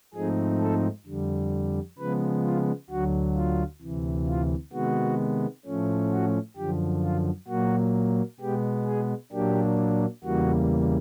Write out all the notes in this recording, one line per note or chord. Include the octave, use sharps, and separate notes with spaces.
G#2 F3 A3 C4 D#4 G#4
A4
F2 D3 G3
C#3 F3 G#3 B3 B4
F4
D2 D3 F#3 F#4
F4
D2 C3 E3
F4
C3 D#3 G#3 B3 F#4
A2 F3 A3 C#4
F#4
F#2 D3 F3 G4
F4
A#2 F#3 A#3 F#4
B2 G#3 B3 G4
G#4
A#2 F#3 A#3 D4 G4
E2 C#3 E3 G3 A#3 F#4